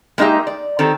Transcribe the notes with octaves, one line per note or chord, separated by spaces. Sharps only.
G#3 A#3 D#4 F#4 G4 E5
D5
D#3 C4 G4 A4